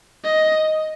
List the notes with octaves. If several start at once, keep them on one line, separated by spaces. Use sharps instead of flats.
D#5